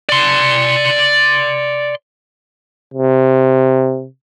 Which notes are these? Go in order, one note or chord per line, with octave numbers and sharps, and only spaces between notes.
D5 C6
C3